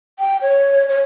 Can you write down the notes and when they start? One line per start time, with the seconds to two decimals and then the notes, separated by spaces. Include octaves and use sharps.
0.19 G5
0.42 C#5
0.89 C#5